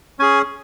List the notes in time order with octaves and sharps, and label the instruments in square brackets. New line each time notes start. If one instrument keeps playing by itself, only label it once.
[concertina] C#4 G#4 G#5